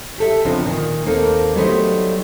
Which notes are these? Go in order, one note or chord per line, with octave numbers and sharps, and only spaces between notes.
G4 A4 E5
C#3 F3 B3 C4 D4 D#4
A#2 D#3
D#2 A#3 C4 D#4 A4
F#3 G3 A3 B3 D#4 C5